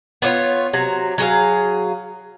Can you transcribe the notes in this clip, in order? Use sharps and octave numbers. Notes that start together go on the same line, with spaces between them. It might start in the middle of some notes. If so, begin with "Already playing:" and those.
B3 D4 F4 C#5
C3 F#3
F#3 G#4 F5